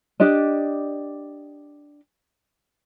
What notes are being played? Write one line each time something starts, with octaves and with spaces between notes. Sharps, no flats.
D4 G4 D5 D#5